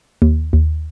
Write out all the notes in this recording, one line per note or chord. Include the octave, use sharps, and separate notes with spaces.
D#2
D#2